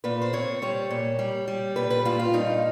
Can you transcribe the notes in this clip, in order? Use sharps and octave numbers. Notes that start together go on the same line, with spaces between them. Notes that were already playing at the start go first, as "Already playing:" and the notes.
A#2 B4
C5
C4 C#5
G3 C#5
A#2
G3
G3
A#2 B4
B4
A#2 F4
F4
G2 D#4